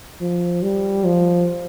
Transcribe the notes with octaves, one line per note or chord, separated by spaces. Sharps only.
F3
G3
F3